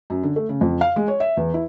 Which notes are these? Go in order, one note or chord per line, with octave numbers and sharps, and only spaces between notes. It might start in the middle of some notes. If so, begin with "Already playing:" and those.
F#2
D3
A3
C#3
F2
F5
G#3
C#5
E5
E2
E4